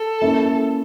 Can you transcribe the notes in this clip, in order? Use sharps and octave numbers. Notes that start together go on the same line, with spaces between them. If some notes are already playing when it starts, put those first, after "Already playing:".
Already playing: A4
A#3 C#4 E4 A#4 E5